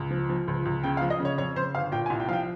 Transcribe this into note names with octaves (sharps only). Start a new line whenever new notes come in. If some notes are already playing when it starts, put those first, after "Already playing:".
Already playing: C#2
F3
F3
C#2
C#2
C#3 G5
F5
F3
D#5
C#3
C#5
F2 C#5
C#3 C5
G1 F5
A#2 G5
G#5
C2
G5
F3 F5 G5